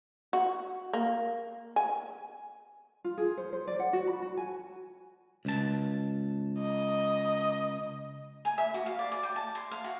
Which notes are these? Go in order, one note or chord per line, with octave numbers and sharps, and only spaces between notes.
F#4
A#3
G#5
F4
G#4
C5
C5
D5
F#5
F#4
B5
F#4
G#5
C#2 A5
D#5
G#5
E5
F#4
F5
D5
D5
G5
A5
C6
F5
F#4